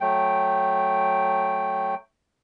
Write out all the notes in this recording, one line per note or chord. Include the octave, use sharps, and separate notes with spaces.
F#3 A3 G5